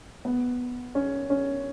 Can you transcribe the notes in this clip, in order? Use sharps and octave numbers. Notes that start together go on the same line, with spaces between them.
B3
C#4
C#4